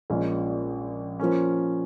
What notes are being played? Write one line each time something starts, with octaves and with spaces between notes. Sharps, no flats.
A#1 A#2 G#3 C#4
F3 A#3 C#4